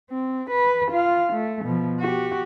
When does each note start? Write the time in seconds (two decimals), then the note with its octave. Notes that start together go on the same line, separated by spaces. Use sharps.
0.10 C4
0.50 B4
0.92 F4 F5
1.33 A3
1.65 B2 F3
2.00 F#4 G4